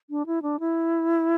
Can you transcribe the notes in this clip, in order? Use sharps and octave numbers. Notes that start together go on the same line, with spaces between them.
D4
E4
D4
E4